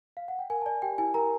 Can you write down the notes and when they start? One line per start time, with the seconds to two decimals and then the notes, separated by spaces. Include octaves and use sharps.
0.17 F5
0.28 F#5
0.39 G5
0.50 A#4 G#5
0.62 A5
0.66 D5 G#5
0.82 G4 G5
0.98 E4 G#5
1.14 A#4 A#5